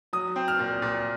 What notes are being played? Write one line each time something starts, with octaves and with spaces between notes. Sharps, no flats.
F#3 D#6
C4
F6
A#2
A#2